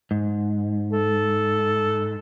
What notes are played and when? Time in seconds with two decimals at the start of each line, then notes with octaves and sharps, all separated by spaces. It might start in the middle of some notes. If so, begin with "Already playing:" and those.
0.11 G#2
0.93 A4